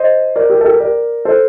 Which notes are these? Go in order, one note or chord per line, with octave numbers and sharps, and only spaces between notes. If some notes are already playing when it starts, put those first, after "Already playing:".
Already playing: C5 D#5
A#4 D5
G4 A#4
A4
G4 A#4
A#4 D5
A4 C5